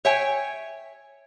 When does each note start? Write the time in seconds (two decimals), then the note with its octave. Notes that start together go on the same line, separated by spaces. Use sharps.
0.05 C#5 E5 G5 G#5